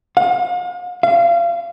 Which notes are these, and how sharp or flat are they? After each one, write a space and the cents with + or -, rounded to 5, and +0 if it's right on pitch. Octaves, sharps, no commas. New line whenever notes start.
F5 +45
F5 -30